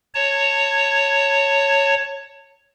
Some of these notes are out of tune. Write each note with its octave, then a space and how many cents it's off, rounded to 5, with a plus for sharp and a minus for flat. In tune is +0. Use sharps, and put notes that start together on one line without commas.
C#5 +0 A5 +40